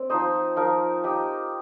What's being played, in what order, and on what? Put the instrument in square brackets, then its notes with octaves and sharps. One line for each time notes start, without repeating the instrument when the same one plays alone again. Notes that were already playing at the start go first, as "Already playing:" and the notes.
Already playing: [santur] C4
F3 D#4 C5 D#5
F3 D#4 A#4
D#4 G4 D#5